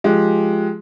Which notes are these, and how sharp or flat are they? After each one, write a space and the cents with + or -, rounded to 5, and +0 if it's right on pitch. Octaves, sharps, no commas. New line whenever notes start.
F3 +0 G#3 +10 G4 +0